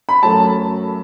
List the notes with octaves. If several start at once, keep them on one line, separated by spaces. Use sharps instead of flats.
B5
F#2 F#3 A3 A5